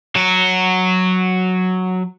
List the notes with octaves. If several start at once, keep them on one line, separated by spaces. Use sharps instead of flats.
F#3 F#4